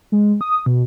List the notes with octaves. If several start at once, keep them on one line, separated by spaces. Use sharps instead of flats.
G#3
D#6
B2